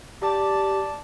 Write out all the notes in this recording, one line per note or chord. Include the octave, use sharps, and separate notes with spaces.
G4 D5 A5